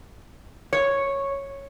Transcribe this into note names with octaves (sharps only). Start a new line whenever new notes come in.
C#5